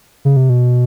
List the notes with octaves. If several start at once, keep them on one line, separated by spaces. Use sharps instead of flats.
C#3
C3
B2